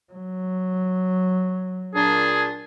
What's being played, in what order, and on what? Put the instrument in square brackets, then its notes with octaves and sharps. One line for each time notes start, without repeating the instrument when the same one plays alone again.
[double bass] F#3
[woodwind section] A#2 D4 [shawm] G#4